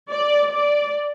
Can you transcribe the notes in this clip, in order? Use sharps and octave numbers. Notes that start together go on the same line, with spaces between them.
D5
D5